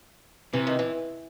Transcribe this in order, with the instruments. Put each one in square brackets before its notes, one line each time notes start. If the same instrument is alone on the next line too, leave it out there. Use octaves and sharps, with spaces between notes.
[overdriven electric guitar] C3 [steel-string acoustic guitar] E3
[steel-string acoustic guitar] D#3
E3